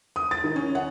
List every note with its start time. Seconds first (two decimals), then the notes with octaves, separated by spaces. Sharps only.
0.16 D#6
0.31 A6
0.44 D#3
0.56 C#4
0.75 F#5